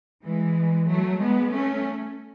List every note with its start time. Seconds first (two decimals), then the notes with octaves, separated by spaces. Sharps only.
0.24 E3 G#3
0.88 F#3 A3
1.19 G#3 B3
1.51 A3 C#4